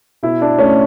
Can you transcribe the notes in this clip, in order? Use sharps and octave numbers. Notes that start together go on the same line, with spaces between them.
B2 E4
D4
A3 C#4